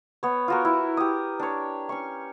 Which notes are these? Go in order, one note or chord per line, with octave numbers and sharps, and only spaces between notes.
B3 C#5
F4 F#4 A#4
E4
G4 D#6
D4 C#5
C#4 C#6